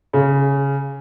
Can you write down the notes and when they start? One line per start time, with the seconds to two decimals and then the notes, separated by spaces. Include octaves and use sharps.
0.13 C#3